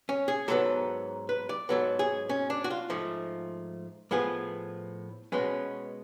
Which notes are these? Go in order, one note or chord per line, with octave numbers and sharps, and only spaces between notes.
C#4
G#4
G#2 F#3 B3 A4
B4
D5
G#2 F#3 B3 A4
G#4
C#4
D4
F#4
F4
G#2 F3 A3
A2 F3 B3 G#4
B2 G#3 B3 C#4